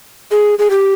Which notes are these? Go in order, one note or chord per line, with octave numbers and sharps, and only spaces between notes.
G#4
G#4
G4